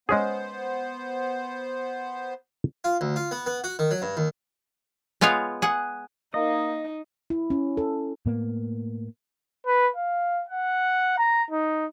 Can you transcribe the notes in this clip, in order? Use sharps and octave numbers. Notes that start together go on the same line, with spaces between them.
G#3 B3 C#4 G#4 C5
F4
D2
F4
B3
B3
F#4
D#3
F#3
G2
D#2
G#3 B3 F4 C#5 F5
G#4 F#5
A#3 D#4 D#5
E4
C#4
A4
A2 A#3 B3
B4
F5
F#5
A#5
D#4